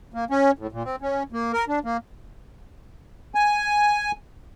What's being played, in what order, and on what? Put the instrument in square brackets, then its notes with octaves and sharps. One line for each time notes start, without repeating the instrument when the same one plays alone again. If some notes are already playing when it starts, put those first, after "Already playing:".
[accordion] A#3
C#4
A2
A#2
C4
C#4
A#3
A#4
D4
A#3
G#5